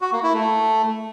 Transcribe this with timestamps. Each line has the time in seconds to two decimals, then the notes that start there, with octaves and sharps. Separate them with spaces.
0.01 F#4
0.12 A#3
0.23 E4
0.34 A3